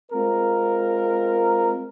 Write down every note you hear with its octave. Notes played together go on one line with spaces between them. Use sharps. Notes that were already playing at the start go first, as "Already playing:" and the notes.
G#3 C4 F4 A#4